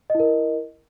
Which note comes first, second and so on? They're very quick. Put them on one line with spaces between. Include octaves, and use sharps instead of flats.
D#5 E4 A#4